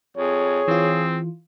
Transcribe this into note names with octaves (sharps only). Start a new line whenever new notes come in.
F2 G#4 C#5
E3 C4 F4